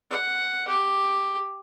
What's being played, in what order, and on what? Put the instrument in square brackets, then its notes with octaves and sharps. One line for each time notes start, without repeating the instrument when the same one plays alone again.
[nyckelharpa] F#5
G4